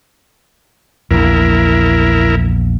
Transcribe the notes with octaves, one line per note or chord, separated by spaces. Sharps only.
A#1 E2 E4 A#4